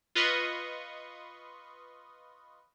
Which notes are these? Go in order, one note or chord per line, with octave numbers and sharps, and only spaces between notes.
F4 B4 D#5 C6 C#6 D#6